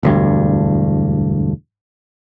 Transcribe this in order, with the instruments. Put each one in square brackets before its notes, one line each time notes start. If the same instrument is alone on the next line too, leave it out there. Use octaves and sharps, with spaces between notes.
[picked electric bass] E1 D2 G2